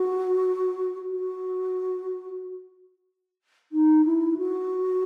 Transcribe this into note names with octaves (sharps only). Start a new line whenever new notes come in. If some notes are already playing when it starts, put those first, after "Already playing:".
Already playing: F#4
F#4
D#4
E4
F#4